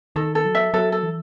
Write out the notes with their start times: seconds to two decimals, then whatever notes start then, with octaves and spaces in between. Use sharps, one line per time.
0.16 D#3 A4
0.35 A4
0.45 F#3
0.55 E5
0.74 F#3 A4
0.92 A4
1.03 E3